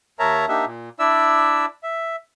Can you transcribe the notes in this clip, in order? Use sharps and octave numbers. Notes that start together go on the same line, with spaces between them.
D#2 A#4 C#5 E5 A5 A#5
A#3 D4 D#4 G4 E5
A#2
D4 E4 D5 E5 E6
E5